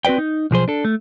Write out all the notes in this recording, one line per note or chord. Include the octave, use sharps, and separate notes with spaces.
C4 F#4 B4 D5 G5
D#4
B1 F3 G#4 C5
D4 A4
A3